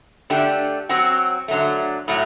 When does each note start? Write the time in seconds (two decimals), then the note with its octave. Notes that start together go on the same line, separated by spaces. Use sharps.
0.30 D3 A3 D4 G4
0.89 F#3 C4 F#4
1.48 D3 F#3 A3
2.08 A2 F#3 A3